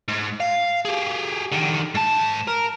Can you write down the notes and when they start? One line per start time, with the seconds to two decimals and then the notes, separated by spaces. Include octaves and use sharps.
0.08 G#2
0.40 F5
0.85 G4 G#4
1.52 D3 D#3
1.95 G#2 A5
2.47 A#4